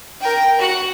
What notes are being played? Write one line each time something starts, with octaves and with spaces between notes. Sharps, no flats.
A#4 G5
F#4 F#5